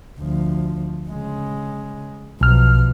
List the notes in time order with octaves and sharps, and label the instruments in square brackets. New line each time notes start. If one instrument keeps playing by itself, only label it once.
[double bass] D2 F3
C#3 G#3
[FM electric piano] B1 F6 [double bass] B2 F3